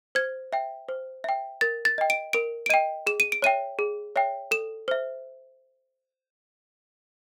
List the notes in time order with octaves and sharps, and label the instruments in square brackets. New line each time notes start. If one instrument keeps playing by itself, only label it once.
[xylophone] C5 G#6
E5 G5
C5
E5 G5
A#4 A6
A6
D#5 G5
D7
A#4 D7
D7
D#5 G5 D#7
G#4 E7
D#7
D7
C#5 E5 G5 D#7
G#4
C#5 E5 G5
A4 E7
C5 E5